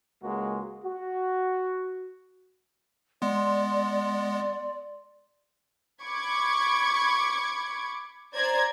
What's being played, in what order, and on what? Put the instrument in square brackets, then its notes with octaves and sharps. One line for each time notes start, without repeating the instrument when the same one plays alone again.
[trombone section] C#2 G#3 A#3 F#4
F#4
[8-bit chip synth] G#3 B3 [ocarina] D5 [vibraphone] C6
[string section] B5 C#6 D6 G#6
C5 D5 A#5 G#6